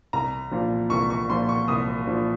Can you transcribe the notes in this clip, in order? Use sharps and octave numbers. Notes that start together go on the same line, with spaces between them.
C2 A#5
A#2 F3
C2 C#6
C#6
A#2 F3 C6
C#6
C2 D#6
A#2 F3